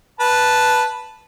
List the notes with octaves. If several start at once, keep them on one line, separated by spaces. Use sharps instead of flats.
B4 A5